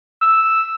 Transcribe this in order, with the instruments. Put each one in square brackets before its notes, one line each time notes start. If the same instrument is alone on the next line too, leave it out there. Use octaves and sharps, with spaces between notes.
[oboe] E6